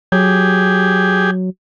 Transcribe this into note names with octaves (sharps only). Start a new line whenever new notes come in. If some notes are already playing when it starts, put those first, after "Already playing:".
F#3 G4 G#4